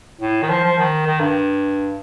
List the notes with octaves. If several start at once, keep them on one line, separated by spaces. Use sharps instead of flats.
A2
D#3
F3
F3
D#3
D#3
G2